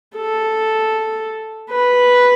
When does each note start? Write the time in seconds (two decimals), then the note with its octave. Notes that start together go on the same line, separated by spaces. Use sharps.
0.16 A4
1.70 B4